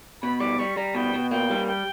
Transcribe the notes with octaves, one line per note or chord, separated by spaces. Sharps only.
B2 B5
G3 D6
G3 C#6
G3 A#5
B2 G5
B2
A#3 G5
G3
G5